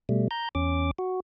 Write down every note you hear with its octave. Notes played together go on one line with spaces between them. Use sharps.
B2 G3 A3
A#5 G6
E2 C#4 D6
F#4